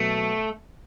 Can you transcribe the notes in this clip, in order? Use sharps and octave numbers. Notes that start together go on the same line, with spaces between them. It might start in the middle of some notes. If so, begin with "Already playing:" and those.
Already playing: B2 F#3 A3 B3